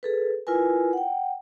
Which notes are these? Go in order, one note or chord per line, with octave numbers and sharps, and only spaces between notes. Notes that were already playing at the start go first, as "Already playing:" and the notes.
G#4 A4 B4
E4 F4 A#4 B4 G#5
F#5 G5